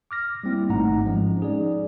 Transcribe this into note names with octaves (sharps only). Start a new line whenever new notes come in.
D6 F6 A#6
G3 A#3 C4 E4
G#1 G#2 A3 D#4 F#5 A#5
F3 G#3 C#4
D#4 G#4 D5